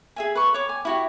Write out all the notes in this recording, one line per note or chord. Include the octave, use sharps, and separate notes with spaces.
G#4 E5 G#5
B4 C#6
C#5 D6
G#5
E4 F#4 G4